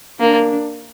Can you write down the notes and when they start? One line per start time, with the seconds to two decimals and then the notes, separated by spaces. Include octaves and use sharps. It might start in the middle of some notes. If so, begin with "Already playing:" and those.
0.20 A#3 D4